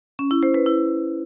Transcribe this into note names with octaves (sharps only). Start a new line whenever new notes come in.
C#4
E4
C5
B4
E4